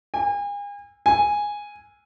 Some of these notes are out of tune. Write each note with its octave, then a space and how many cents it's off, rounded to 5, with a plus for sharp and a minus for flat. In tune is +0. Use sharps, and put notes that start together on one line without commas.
G#5 -40
G#5 -5